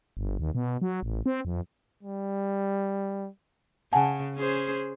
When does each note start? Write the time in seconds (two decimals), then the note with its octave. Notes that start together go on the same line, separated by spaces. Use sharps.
0.17 G1
0.40 D#2
0.55 B2
0.82 F#3
1.02 A1
1.26 C4
1.45 F2
2.03 G3
3.93 C#3 F#5 G#5 A5
4.36 C#4 G#4 C5